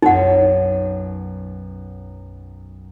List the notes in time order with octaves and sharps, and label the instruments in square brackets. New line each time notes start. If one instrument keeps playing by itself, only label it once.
[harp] B1 F#2 [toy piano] D#4 F#5